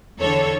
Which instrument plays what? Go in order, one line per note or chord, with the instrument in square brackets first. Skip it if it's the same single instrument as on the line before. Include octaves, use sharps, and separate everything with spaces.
[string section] E2 D3 A4 C#5